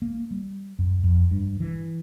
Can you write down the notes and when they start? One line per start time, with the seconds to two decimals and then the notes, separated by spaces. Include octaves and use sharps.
0.02 A#3
0.31 G3
0.79 F#2
1.04 F2
1.31 G2
1.60 E3